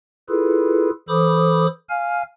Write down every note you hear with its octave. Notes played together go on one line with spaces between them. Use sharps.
E4 F4 G#4 A4 B4
E3 A4 C5 B5 D6 D#6
F5 G#5 F6